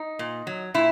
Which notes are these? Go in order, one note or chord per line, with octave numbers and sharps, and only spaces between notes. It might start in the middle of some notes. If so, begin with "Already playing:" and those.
Already playing: D#4
A#2
F#3
A#2 E4